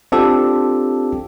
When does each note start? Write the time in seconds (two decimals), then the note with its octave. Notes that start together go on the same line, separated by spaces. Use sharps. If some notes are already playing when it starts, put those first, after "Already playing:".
0.12 C4 D4 F4 G4 A4